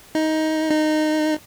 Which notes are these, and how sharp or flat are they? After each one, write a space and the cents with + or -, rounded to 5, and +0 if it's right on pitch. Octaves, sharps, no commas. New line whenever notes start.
D#4 +15
D#4 -15